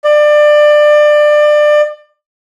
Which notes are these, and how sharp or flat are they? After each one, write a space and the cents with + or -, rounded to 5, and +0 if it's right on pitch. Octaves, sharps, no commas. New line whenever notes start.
D5 +25